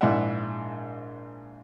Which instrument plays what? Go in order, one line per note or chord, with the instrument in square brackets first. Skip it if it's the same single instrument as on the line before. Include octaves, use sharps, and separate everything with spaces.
[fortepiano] A#1 G#2 E4 D5 E5 F#5